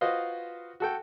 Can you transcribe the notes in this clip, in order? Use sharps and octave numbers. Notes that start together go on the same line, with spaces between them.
F4 F#4 B4 C5 D#5 F5
F#4 A4 G5